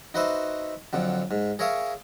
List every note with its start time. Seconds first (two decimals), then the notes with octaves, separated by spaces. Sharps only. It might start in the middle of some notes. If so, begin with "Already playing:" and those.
0.14 D#4 F#4 B4 C5 E5
0.93 F2 D3 F#3
1.31 G#2
1.59 G#4 A#4 C#5 E5 F5